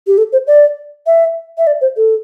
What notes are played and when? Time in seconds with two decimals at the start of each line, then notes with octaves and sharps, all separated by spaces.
0.07 G4
0.18 A4
0.32 C5
0.47 D5
1.07 E5
1.58 E5
1.67 D5
1.81 C5
1.97 A4